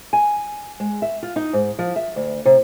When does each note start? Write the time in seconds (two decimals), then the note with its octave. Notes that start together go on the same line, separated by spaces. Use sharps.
0.13 G#5
0.80 G#3
1.02 E5
1.23 F4
1.36 D#4
1.53 G#2
1.79 F3
1.96 E5
2.16 D2
2.45 C3